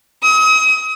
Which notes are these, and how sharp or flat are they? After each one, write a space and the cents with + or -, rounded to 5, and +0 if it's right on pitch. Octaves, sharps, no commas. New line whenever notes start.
D#6 +40